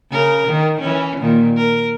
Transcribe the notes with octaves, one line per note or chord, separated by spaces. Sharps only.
C#3 A#4
D#3
E3 C#4
A#2 D#3
A#4